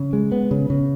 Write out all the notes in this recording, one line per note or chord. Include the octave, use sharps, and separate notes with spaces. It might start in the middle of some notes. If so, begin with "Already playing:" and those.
Already playing: C#3
G#3
B3
C#3
C#3